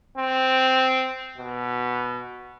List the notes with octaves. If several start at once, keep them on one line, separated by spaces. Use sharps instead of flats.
C4
B2